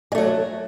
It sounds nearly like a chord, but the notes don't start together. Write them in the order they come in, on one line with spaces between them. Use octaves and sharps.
G#3 A3 F#3